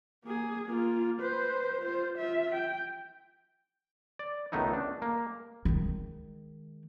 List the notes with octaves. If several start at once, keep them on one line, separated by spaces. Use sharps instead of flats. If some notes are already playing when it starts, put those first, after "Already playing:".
A#3 G#4
A#3 F4
B4 C5
F4 C5
F4 E5
G5
D5
C#2 D#3 A3 B3 D#4 E4
D4
A#3
D#3 G#3